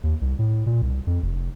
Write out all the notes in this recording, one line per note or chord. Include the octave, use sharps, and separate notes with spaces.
D#2
C2
A2
A#2
C2
F2
F1